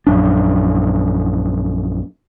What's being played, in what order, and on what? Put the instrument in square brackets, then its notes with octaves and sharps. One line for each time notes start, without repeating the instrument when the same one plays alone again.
[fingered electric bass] A#1 F#2 D4